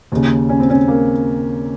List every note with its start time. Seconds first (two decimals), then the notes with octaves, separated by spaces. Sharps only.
0.12 D#2 C#3
0.49 C#4
0.60 C4
0.70 C#4
0.88 A#3